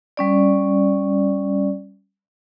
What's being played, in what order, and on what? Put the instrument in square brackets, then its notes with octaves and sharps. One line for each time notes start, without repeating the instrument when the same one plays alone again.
[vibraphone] G3 C#4 D5